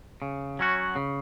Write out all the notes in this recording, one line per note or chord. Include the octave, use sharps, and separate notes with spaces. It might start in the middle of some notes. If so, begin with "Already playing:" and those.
C#3
F#3 C#4 F#4
C#3